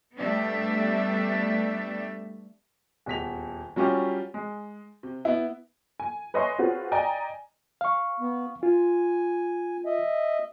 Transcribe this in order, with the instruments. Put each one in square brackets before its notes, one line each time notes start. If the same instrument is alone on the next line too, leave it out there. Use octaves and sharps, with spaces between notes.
[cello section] G3 A3 B3 D4 G4 E5
[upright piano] D#1 E2 B6 F7
F#3 G3 C#4 F4 G4
G#3
C3
B3 E4
[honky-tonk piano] G#5
B4 C#5 D#5 E5 G#5 C6
C4 F4 F#4 G#4 B4 C#5
D5 D#5 G5 G#5 A#5
[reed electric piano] F5 C#6
[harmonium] B3
[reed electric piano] F4 [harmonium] G#5
[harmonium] D#5 E5